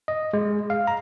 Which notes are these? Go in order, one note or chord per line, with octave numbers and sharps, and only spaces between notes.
D#5
G#3
F5
A#5